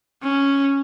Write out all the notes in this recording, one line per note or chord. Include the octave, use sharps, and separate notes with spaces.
C#4